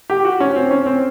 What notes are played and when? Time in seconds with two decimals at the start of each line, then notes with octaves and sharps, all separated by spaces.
0.10 G4
0.25 F#4
0.40 C#4
0.56 C4
0.71 C#4
0.86 C4